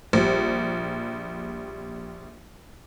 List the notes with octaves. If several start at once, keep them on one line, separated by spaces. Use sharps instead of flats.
A#1 G3